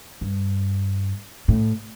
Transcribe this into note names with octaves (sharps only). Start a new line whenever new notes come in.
G2
A2